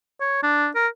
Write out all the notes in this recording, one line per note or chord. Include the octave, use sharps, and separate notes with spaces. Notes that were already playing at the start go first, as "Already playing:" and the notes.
C#5
D4
A#4